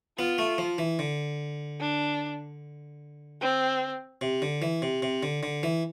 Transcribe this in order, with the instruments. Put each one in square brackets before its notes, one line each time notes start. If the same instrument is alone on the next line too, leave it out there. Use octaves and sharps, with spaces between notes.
[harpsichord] B3 [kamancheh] F4
[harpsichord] A3
F3
E3
D3
[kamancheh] D4
C4
[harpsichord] C3
D3
E3
C3
C3
D3
D3
E3